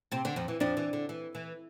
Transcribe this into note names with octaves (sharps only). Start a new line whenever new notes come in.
C3 C4
D3 D4
F2 F3
E3
F2 F3 D4
E3
D3
E3
E3